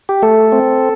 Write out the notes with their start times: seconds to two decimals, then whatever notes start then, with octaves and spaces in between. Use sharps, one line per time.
0.09 G4
0.22 A3 A4
0.52 C4